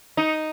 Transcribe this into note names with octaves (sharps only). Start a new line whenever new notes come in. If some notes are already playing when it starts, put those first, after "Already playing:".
D#4